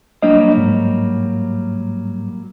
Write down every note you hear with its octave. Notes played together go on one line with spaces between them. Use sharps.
F#3 G3 A#3 D4 D#5
G#2